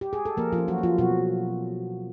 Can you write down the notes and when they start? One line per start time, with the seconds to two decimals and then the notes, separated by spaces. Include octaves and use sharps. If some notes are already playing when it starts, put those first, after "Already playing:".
0.01 G4
0.13 G#4
0.25 A4
0.37 F3 A#3 A#4
0.52 F3 F4
0.58 C#4
0.68 F#3 F#4
0.78 A#3
0.83 F3 F4
0.98 B2 F#3 F#4